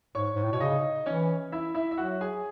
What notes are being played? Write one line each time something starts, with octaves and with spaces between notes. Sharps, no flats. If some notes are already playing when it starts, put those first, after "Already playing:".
G#2 C#5 C#6
G#2
A2
B2 C#5
C#3 D#4 D#5
E3 C#4 C#5
E4 E5
E4 E5
E5
F#3 F#4 F#5
G#4 G#5